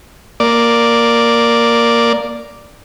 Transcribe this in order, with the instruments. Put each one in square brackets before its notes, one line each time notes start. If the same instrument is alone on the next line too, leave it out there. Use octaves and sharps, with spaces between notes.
[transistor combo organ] A#3 D5